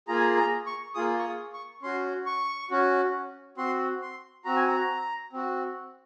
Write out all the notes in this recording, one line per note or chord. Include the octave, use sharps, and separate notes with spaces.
A#3 F4 G#4 A#5
G#5
A#5
A#5
C#6
A#3 F4 G#4 D#6
C#6
D#6
C#6
C#4 F#4 C6
C#6
C#4 F#4
C4 F#4 C6
C6
C4 F#4 A#5
G#5
A#5
C4 F#4